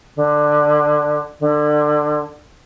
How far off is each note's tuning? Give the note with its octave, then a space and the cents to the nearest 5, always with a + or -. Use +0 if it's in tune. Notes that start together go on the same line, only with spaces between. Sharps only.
D3 +15
D3 +25